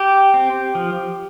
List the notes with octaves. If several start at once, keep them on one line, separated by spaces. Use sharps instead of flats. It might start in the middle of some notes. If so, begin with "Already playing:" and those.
Already playing: G4
C4
F3